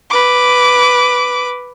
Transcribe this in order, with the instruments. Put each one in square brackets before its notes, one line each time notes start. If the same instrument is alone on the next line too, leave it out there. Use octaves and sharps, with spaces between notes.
[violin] B4 D6